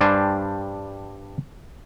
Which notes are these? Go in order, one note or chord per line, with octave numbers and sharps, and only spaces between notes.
G2 G3 D4 C5 G#5